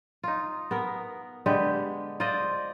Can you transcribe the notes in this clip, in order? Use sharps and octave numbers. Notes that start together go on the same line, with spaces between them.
D#4 F4
B3 A#4
D3 G#3 G4 B4
F4 C5 D5 D#5